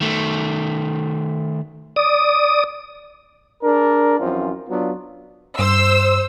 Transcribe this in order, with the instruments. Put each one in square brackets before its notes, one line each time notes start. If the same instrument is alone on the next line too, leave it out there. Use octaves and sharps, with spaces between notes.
[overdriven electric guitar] D#3 A3
[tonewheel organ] D5 D#6
[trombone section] D4 G#4 A#4
F#2 E3 F3 C4 F4
F#3 B3 D4 F4
[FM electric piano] G2 [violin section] C5 E6